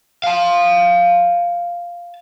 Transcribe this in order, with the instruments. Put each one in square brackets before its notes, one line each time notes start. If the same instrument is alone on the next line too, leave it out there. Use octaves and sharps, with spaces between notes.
[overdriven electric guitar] F5 A5